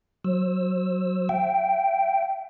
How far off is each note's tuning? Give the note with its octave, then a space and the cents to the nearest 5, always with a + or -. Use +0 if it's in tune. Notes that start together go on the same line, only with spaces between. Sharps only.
F#3 +0 C5 +35 E6 +0
E5 +35 G5 -10